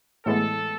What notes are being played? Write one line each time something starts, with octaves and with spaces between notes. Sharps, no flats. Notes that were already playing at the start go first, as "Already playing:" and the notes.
A2 E3 G#3 B3 A4